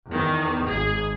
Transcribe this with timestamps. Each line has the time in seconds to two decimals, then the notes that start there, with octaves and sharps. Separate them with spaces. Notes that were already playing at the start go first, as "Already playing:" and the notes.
0.11 E2 D#3
0.68 G#1 G#4